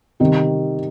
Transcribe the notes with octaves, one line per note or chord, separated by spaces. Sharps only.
C3 D#3 G3